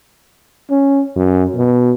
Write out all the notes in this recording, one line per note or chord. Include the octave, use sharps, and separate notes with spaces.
C#4
F#2
B2